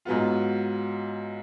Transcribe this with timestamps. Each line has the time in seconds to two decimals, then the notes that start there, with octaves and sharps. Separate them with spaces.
0.05 G#2 F#3 B3 F4